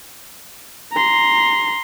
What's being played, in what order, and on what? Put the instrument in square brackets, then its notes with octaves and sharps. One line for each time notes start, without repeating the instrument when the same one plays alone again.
[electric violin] A#5 C6